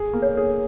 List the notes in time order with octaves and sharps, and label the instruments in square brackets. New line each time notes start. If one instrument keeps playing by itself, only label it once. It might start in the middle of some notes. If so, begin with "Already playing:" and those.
Already playing: [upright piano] G#4
A#3
[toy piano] C#5
[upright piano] G#4